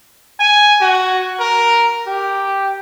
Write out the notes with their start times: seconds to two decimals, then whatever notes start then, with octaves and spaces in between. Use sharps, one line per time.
0.40 G#5
0.81 F#4
1.40 A#4
2.07 G4